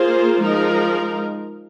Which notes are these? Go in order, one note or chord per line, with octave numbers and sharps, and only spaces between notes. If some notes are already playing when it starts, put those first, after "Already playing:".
Already playing: A#3 F4 G#4 C5
F3 G#3 D#4 A#4